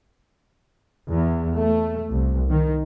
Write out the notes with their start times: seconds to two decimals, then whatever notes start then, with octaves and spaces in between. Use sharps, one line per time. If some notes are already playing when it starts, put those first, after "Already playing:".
1.10 E2
1.58 A3
2.11 C2
2.49 D#3